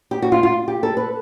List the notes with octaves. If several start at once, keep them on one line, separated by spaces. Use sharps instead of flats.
G4
F#4
F4
F4
G4
A4
B4